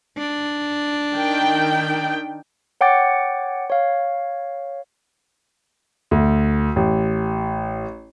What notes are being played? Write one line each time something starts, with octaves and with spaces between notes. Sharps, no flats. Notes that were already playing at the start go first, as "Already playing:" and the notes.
D4
D#3 G5
C#5 F#5 G5 D6 A6 C#7
C#5 F5
D2
A1